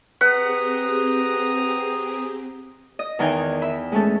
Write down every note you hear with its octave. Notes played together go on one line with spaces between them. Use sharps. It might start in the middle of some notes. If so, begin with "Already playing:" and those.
C4 G4 G#4 B4 F#5 A#5 D#6
D#5
E2 D#3 E3 D#4 G5 G#5
E5 B5
G#3 A3 C#4 A4